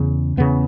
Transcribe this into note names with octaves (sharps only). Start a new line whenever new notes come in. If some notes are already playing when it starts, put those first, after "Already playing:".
Already playing: E2 C#3
E2 C#3 B3